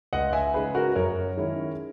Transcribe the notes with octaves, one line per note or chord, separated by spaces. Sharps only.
C#2 D#5 F#5
E5 G#5
C#3 G#3 D#4 G#4 B4
F#4 A#4
F#2 A#4 C#5
D#3 G#3 C#4 E4